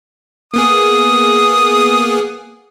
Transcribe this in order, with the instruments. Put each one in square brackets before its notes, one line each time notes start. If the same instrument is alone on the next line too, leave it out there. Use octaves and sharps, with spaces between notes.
[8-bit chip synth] A#3 B3 G#4 [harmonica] D#6